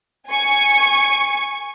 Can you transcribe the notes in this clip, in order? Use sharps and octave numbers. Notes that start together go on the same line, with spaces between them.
G#5 C#6